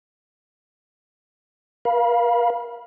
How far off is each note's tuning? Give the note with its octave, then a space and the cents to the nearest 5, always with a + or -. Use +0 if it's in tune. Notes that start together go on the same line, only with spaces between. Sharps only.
A#4 +45 F5 +0 B5 -35